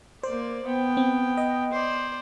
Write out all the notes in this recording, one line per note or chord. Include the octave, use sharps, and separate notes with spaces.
A#3 C5 D5
B3 G5
C4
D#5
C5 D5